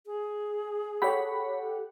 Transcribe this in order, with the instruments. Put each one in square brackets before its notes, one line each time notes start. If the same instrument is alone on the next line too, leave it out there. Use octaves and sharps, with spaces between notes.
[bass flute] G#4
[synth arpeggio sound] G4 A4 F#5 [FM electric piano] C#5 B5